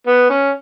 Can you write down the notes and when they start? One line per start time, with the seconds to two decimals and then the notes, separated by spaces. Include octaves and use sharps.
0.07 B3
0.30 C#4